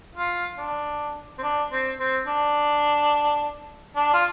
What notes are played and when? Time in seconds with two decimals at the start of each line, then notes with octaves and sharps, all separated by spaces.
0.15 F4
0.58 D4
1.38 C4
1.43 D4
1.71 C4
2.00 C4
2.27 D4
3.96 D4
4.13 F4